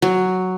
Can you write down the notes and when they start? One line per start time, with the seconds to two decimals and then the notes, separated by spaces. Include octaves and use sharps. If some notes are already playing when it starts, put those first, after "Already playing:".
0.02 F#3